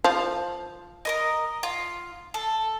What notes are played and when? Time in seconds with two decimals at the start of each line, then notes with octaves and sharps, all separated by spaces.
0.04 F3
1.05 A#4 B4 D#5
1.63 F4
2.34 A4